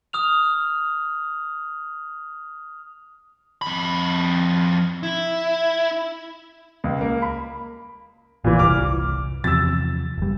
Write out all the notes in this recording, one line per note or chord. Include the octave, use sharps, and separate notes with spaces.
D#6 F6 F7
F2 B5
E4
C#2
A#3
B5
A1 A#2 E3
F#1 C2 D6 F6
E2 C3 F3 E6 A6
F#1 G3